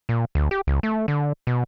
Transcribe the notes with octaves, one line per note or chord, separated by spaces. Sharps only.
A#2
D2
G4
C#2
A3
D3
B2